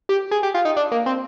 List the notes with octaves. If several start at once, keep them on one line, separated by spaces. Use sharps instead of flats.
G4
G#4
G4
F4
D#4
D4
A#3
C4